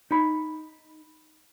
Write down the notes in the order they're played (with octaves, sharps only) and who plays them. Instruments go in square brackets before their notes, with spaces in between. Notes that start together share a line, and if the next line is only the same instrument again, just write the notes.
[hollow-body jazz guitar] D#4 B5